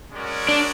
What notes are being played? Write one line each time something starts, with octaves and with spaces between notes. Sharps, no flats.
G#3 C#4 F#4 A#4 D5
D4